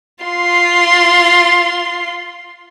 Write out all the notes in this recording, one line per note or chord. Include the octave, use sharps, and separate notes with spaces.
F4 C6